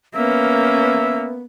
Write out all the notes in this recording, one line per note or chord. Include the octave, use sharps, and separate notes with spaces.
A#3 B3 C#4 E5